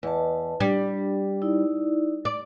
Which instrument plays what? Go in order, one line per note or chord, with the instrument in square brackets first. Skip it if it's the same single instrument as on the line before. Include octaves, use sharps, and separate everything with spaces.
[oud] E2 [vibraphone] B4 D#5 A5
[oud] G3 [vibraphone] D4
[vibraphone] D#4 E4 D5
[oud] D5